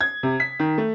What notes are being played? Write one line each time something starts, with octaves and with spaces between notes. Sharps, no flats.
G#6
C3
B6
D#3
A3